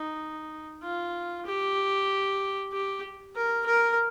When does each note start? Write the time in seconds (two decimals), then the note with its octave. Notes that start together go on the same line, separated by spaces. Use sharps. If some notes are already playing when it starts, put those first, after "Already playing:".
Already playing: D#4
0.83 F4
1.46 G4
2.72 G4
3.36 A#4
3.66 A#4